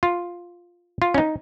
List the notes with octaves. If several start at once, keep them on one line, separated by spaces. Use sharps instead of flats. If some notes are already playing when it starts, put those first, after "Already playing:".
F4
F4
C#4
D#4